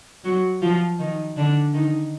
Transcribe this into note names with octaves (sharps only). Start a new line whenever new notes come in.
F#3 F#4
F3 F4
D#3 D#4
D3 D4
D#3 D#4